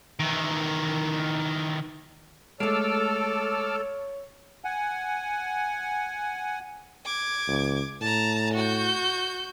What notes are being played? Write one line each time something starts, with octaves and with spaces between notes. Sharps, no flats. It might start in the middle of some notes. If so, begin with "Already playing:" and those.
D#3 E3
G#3 A3 A4 C#5 D6 E6 F6
F#5 G#5
D6 G#6
C#2
A2 A5 A#5
F#4 G6